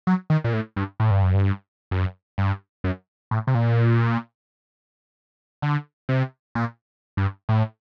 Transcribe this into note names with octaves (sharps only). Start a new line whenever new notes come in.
F#3
D#3
A#2
A2
G2
A2
G2
F#2
G2
F#2
G2
F#2
A2
C3
A#2
D3
C3
A#2
G2
A2